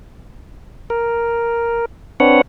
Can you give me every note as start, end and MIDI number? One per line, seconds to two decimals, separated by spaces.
0.90 1.85 70
2.20 2.41 60
2.20 2.41 62
2.20 2.41 71
2.20 2.41 73
2.20 2.41 78